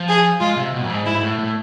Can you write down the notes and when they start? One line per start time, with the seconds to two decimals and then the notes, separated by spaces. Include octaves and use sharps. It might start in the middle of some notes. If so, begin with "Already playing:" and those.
Already playing: F3
0.09 G#4
0.40 G#3 F4
0.56 C3
0.73 B2
0.84 F2
0.89 G#2
1.06 G#2 E4
1.23 A2
1.39 A2